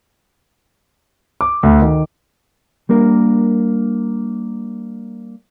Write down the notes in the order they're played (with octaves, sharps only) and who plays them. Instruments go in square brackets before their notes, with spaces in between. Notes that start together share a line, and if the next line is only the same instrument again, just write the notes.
[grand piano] D6
D2
D#3
[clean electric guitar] G3 A#3 D4 A#4